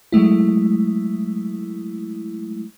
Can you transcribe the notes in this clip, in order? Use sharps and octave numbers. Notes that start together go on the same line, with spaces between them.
F#3 G#3 A3 E4